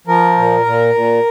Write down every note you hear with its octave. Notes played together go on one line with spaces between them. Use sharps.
F3 A#4
A#2
A#2
A#2